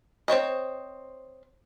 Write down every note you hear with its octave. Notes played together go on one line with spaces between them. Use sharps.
C4 C5 C#5 D#5